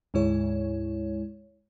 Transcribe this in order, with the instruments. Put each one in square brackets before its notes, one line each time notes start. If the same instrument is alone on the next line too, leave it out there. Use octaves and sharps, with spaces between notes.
[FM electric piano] D2 G#2 G#3 E4 C#5